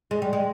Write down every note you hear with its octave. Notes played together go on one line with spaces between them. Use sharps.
G#3
G3
G#3